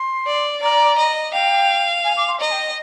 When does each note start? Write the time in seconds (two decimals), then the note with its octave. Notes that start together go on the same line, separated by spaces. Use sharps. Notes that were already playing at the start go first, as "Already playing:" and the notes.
Already playing: C6
0.27 D5
0.62 D5 A#5
0.98 D#5
1.33 F5 G5
2.04 G#5
2.17 D6
2.28 C6
2.40 D#5 A#5
2.51 G5